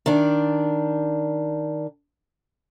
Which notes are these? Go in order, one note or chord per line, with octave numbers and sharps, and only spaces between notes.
D#3 D4